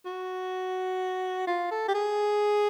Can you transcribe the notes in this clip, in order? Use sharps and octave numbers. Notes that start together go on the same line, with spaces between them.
F#4
F4
A4
G4
G#4